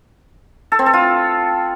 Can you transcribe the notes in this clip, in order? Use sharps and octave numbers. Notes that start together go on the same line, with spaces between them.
A4
C4
A4
F4